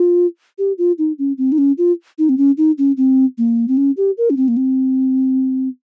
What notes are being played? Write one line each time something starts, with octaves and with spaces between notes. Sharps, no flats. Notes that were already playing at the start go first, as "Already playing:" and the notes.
Already playing: F4
G4
F4
D#4
C#4
C4
D#4
C#4
F4
D#4
C4
C#4
D#4
C#4
C4
A#3
C4
C#4
G4
A#4
C#4
C4
A#3
C4